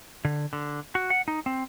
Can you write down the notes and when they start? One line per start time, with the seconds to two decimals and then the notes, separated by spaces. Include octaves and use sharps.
0.25 D3
0.53 D3
0.95 F#4
1.10 F#5
1.28 D#4
1.46 C4